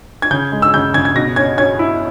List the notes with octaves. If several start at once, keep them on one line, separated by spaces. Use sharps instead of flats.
G#6
C#3 G6
G#3
E6
C#3 G6
C#3 G#6
G#6
B2 A#6
C#4 G#6
C#4 G#6
E4